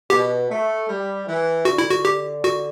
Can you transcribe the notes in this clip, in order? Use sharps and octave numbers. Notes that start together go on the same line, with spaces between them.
B2 G4
A3
G3
E3
D3 F#4
E4
F#4
G4
F#4